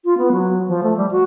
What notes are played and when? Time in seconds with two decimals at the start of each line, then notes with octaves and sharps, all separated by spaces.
0.05 F4
0.18 B3
0.32 F#3
0.68 F3
0.83 A3
0.97 G3
1.11 F#4